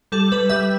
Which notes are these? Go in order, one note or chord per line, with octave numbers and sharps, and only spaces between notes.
G3 A4
G3 B4
G3 E5